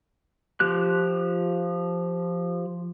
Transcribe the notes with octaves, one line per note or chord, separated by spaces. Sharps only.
F3 F4 G4 F#6